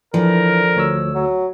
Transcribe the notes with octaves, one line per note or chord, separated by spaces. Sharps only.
D3 E3 F3 A#4
D2 C#5 E6
F#3